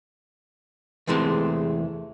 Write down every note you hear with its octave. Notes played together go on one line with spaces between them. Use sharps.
E2 C3 E3 G#3 A3